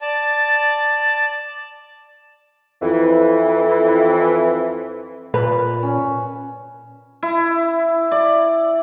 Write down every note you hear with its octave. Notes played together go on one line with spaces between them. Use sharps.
D5 A5
F2 E3
A#2 B4 A5
C#4
E4
D5